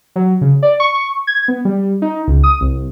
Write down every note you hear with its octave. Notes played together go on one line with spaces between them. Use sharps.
F#3
C#3
D5
C#6
G#6
B3
G3
D#4
C#2
D#6
C2